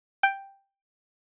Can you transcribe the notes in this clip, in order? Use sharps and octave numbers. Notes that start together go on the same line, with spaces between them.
G5